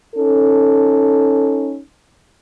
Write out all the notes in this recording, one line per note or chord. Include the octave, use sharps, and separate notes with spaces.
C#4 D#4 A4